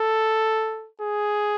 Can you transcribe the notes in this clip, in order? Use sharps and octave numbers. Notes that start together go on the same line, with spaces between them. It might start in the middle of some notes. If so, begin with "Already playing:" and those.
Already playing: A4
G#4